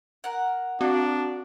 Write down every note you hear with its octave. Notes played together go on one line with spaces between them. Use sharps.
A#4 F#5
C4 D4 F#4